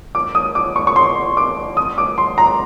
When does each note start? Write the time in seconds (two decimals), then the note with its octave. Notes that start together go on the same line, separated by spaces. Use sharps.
0.15 D6
0.35 D#6
0.55 D6
0.76 C#6
0.87 C#6
0.96 C6
1.37 D6
1.77 D#6
1.98 D6
2.18 C6
2.38 A#5